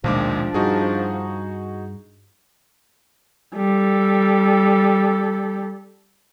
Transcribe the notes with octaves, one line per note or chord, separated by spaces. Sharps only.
A#1 D#2 B2 F3 G#3 D4 D6
G2 D#4 F#4 G#4
G3 A4